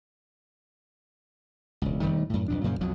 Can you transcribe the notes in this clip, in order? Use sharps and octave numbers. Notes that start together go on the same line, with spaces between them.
E1 C#2
E1 D#3 G3 A3
F#2 A2
B1 F2 D4
F#2 A#2 C#3 F3
B1 F2 B2 F#3